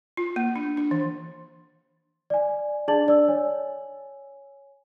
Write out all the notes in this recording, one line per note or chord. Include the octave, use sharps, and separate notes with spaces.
F4
A#3
D4
D4
E3
D5 G#5
D4 G#4 D5 A5 A6 F#7
D4 D5 E6
C#5 G#5